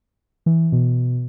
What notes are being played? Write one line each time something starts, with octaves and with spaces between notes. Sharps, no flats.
E3
B2